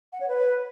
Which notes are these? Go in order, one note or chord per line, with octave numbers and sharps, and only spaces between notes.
F#5
C#5
B4